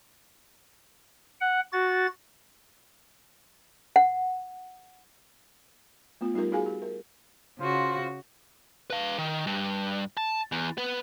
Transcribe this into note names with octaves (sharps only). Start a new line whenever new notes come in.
F#5
F#4 A6
F#5
A3 B3 F4
G3 D#4 F4 G4 A#4
D#4 F#4 G#4 F5 G#5
G4
A#4
C#3 F4 F#4 C5
B4 F5
D#3
G2
A5
E2
B3 B4